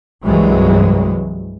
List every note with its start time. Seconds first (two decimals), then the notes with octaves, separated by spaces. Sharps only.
0.24 C2 G2 E3 F#3 G#3